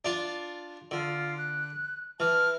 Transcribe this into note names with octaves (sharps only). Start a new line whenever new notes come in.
D4 F4
D3 F4
F#6
E3 A5 F6